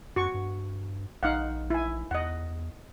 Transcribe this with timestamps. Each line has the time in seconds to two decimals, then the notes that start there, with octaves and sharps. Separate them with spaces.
0.16 F#2 F#4 C#6
0.34 G2
1.23 A#1 D#4 F5 F#5
1.70 E4 G#5
2.11 E2 D#5 F#5